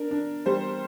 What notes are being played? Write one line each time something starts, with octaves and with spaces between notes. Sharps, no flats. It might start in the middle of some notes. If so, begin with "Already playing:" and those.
Already playing: D4 A#4
D4
G3 C5